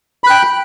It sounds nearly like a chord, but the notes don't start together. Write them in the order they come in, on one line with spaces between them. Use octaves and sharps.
B5 F#6 G5